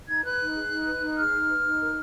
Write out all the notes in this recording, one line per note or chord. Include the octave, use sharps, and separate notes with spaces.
D#4 G#6
B4 F#6
D#4
G#4
D#4
B4
D#4
G#4 F6
D#4
B4
D#4
A#4